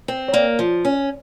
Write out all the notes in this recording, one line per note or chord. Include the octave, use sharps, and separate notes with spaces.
C4
C#5
A#3 D5
F3
C#4